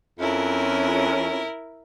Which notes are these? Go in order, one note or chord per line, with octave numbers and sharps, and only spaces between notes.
F2 C#4 E4 A#4